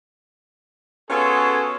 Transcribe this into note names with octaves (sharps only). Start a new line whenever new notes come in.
B3 C#4 F4 F#4 G#4 A4